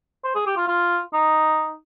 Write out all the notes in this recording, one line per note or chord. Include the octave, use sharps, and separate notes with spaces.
C5
G#4
G4
F4
F4
D#4